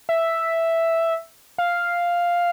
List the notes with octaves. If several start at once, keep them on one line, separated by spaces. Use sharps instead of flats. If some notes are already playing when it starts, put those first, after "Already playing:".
E5
F5